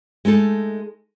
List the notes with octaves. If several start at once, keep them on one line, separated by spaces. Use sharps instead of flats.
G#3 A3 D#4 A4